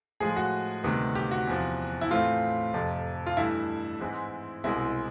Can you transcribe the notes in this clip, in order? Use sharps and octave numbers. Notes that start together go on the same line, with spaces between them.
A2 F3 G#3 G#4
F#4
D2 C3 D#3 G3 B3
G4
F#4
E2 C3 F3
E4
A2 E3 A3 C4 F4
F2 C3 F3 A3
F4
G2 E3 A3 E4
G#2 E3 G#3 C4
C2 B2 G#3 C4 E4